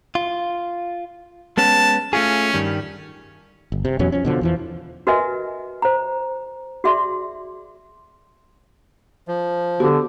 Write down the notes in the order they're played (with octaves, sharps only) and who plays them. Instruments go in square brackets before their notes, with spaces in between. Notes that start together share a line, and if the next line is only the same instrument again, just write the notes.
[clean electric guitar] F4
[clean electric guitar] G#3 B3 C#4 [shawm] A5
[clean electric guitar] A3 F4 G#4 [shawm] C#4
[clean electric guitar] G2 D#3 G3
[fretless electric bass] G1
C3
E2 B2 F#3 C#4
F3 C#4
B2 D3 F3
E2 E3 F3
[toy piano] F#4 A#4 B4 D#5 E5 G#5
C5 A#5
F#4 G#4 D5 E5 C6
[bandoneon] F3
[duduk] D3 [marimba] B3 F#4 G4